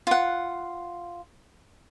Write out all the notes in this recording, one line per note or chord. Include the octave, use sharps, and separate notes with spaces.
F4 F#5